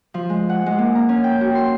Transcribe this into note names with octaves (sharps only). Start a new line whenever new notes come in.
F3
G#3
F#5
G#3
A#3
A#5
C#4
G5
F#4
C6